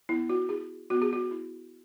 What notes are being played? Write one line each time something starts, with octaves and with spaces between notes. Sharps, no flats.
B3 E4
F#4
E4 G#4
B3 F#4
G#4
F#4
E4